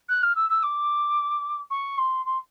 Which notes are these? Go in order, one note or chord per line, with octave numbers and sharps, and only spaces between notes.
F#6
F6
E6
E6
D6
C#6
C6
C6